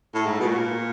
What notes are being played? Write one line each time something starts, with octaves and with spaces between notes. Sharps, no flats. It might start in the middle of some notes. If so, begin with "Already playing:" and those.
A2
G#2
B2
A#2